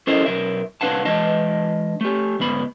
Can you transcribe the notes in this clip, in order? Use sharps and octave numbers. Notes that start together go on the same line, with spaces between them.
C#4 E4 A4 A#4 C5 D#5
B1 C3 A#4 E5
C2 D4 B4 F5 F#5 A5
E3 G#3 D4 D#5 A5
A3 G4
D2 G#2 B3 B5